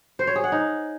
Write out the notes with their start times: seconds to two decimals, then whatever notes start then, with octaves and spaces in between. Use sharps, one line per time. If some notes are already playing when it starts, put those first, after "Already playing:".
0.19 C5
0.27 C#5
0.36 G#4
0.44 F#5
0.52 D#4